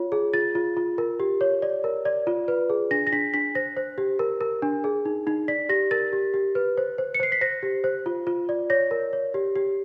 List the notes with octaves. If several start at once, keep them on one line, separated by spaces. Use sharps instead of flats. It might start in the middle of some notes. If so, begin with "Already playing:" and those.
Already playing: F4 C#5
G#4
F4 A6
F4
F4
A#4
G4
C#5
D5
A#4
D5
F4
B4
G#4
D4 A#6
A#6
D4 B6
D4 B6
C5 A#6
C5
G4
A#4
A#4
D4
G#4
D#4
D#4
D5 B6
G4 A#6
A#4 A6
G4
G4
B4
C5
C5
C#7
C5 C7
B6
C5 A#6
G4
C5
F4
F4
D5
C#5 A#6
A#4
C#5
G4
G4